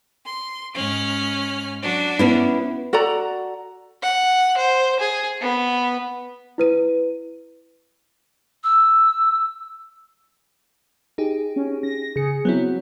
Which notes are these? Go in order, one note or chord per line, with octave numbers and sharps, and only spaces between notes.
C6
G#2 C#4 F6
F#3 D4 F#4
B3 C#4 E4
F#4 A4 D5 A#5
F#5
C5
G#4
B3
E4 B4 D#7
E6
D#4 G4 G#4
C#4
A#6
C#3 G#4 C#7
F#3 B3 C4 E4